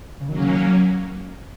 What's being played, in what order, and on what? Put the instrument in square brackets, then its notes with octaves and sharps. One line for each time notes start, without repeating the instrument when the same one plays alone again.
[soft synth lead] C#3
[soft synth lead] D#3 [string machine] F#3 A#3 C#4
[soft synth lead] C#3
D#3
F#3